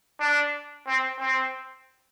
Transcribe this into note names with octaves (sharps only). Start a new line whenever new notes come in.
D4
C4
C4